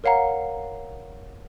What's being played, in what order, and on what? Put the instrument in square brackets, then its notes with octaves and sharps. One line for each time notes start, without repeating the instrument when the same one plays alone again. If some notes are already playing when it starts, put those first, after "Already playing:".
[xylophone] A#4 C#5 F5 F#5 A#5